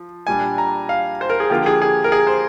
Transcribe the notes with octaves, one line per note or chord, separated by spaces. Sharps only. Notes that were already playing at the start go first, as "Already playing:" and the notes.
Already playing: F3
A#2 G3 D4 G#5
A#5
F5
C5
A#4
G#4
D3 F3 A#3 F4 G4
G#4
G#4
A#4
G#4
C5